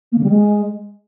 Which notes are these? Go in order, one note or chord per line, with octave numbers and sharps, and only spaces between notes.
A#3
D3
G3
G#3